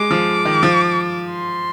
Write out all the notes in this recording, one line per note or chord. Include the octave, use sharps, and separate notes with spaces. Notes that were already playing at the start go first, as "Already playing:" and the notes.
Already playing: G#3 D6
F3
D#3
F3
C6